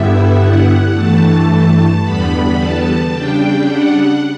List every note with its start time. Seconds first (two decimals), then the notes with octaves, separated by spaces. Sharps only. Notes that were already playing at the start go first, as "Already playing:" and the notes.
Already playing: G2 D3 G3 B3 E4 E5
0.37 F#5
0.93 G2 E3 A3 A5
1.48 A5
2.02 E2 D3 G3 B3 B5
2.57 A5
3.12 C#3 G3 D4 G5
3.67 F#5